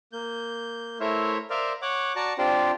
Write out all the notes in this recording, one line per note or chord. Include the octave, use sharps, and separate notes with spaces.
A#3 G6
A3 E4 A#4 C5 C#5 E5
A#4 C5 D5 E5 F5
C#5 F#5 D6
F#4 D5 A5 A#5 C#6
C4 D4 F4 G4 C5 D5